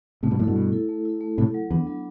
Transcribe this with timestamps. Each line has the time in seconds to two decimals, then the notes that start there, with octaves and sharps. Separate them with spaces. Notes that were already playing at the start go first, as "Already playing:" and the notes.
0.23 A2 C3 A3
0.31 G2 B2
0.39 F#2 A2 E4
0.44 G2 B2 A4
0.56 A3
0.72 E4 A4
0.89 A3
1.05 E4 A4
1.21 A3
1.38 A2 C3 E4 A4
1.54 F#3
1.70 E2 B3 D4
1.87 F#3